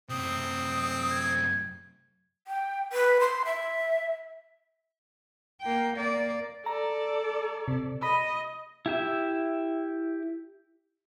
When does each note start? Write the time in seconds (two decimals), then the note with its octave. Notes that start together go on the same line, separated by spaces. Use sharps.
0.10 F#2 C3 C4 D#6
1.12 G#6
2.47 G5
2.93 B4
3.20 C6
3.45 E5
5.61 A#3 G5
5.95 A#3 D5
6.66 A4 D5 A#5
7.68 C3
8.03 D#5 B5
8.86 E4 G4 E5